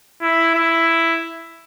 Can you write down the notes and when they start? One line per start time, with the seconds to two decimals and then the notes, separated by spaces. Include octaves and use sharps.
0.22 E4
0.55 E4